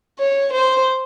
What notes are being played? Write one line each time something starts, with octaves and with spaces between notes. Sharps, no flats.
C#5
C5